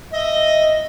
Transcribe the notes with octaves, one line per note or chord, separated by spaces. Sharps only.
D#5 E5